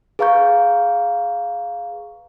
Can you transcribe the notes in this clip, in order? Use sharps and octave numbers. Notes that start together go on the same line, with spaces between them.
G#4 B4 F5 A#5 C#6 G6